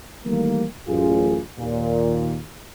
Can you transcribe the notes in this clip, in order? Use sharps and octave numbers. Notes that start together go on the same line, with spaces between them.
D#3 E3 G3 A3 A#3
A1 F#2 F4 G#4
D#2 A#2